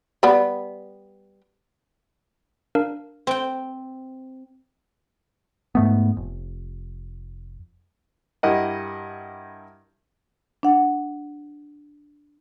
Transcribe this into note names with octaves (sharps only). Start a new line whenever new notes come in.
G3 B3
D4 A#4 F5
C4 G5
G#2 A3 B3
F1
G2 E4 G4 A#4 D#5 F#5
D4 F#5